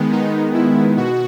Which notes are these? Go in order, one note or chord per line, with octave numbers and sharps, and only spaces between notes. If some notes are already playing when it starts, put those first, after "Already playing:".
Already playing: D#3 G#3 B3
D#4
E4
B2 F#4